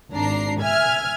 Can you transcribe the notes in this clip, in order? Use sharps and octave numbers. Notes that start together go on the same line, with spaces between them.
G#1 D4 A#5 C7
E5 G#5 F6 G#6